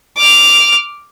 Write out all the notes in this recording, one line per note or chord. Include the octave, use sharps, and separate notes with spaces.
D6 F6